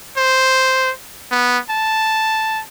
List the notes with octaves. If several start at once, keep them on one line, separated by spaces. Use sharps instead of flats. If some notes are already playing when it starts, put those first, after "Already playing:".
C5
B3
A5